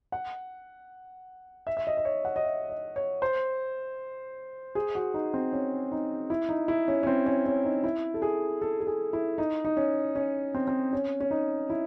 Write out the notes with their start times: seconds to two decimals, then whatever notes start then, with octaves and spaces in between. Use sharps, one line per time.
0.12 F#5
1.67 E5
1.77 E5
1.87 D#5
1.97 D#5
2.05 C#5
2.25 F#5
2.36 D#5
2.44 E5
2.70 D#5
2.96 C#5
3.22 C5
4.75 G#4
4.95 F#4
5.14 D#4
5.34 C4
5.53 C#4
5.92 D#4
6.30 E4
6.49 D#4
6.68 E4
6.88 C#4
7.03 C#4
7.07 C4
7.26 C#4
7.46 C#4
7.65 D#4
7.84 E4
8.14 A4
8.22 G#4
8.62 A4
8.80 A4
8.87 G#4
9.13 E4
9.38 D#4
9.65 D#4
9.77 C#4
10.15 C#4
10.54 C4
10.68 C4
10.93 C#4
11.20 C#4
11.31 D#4
11.70 E4